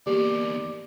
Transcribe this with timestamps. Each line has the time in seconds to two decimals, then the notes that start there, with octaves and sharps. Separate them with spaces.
0.07 E2 A#3 G4 D5